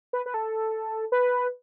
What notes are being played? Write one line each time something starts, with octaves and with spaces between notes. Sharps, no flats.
B4
B4
A4
B4